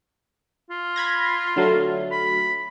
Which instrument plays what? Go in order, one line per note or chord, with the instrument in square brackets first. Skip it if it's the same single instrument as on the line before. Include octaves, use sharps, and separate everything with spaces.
[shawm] F4
[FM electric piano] B5 G#6 A#6
D3 F#3 A3
[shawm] B5